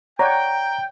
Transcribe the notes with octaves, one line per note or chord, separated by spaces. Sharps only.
C#5 D5 F#5 G5 A#5